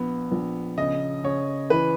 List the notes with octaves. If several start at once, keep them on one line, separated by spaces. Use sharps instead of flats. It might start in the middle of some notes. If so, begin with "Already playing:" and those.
Already playing: A#1 B3
A#1
C#3 D#5
C#3 C#5
E3 B4